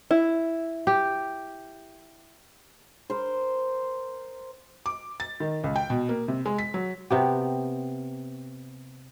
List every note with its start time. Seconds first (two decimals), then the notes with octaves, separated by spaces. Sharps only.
0.11 E4
0.87 G4
3.10 A#4 C5
4.86 D6
5.20 A6
5.40 D#3
5.64 C#2
5.76 G5
5.90 B2
6.09 A#3
6.28 C3
6.46 G#3
6.58 B6
6.74 F#3
7.10 C3 B3 G4